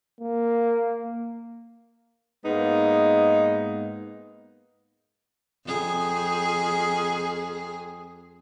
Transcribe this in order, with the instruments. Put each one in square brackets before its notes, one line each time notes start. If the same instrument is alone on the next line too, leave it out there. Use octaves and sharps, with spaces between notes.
[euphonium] A#3
[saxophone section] G#2 G#3 A#3 B3 D#4
[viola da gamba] F2 G#4